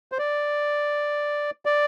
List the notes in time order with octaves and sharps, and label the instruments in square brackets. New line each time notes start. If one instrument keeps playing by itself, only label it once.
[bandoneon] C5
D5
D5